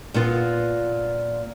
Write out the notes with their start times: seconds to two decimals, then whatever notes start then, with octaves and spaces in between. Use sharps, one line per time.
0.14 A#2 B3 F4